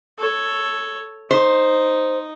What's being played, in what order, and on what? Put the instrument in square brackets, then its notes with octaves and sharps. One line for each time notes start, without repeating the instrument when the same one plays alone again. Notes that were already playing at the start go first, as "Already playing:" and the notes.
[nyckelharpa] A4 C#5
[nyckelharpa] D#4 [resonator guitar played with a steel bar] C5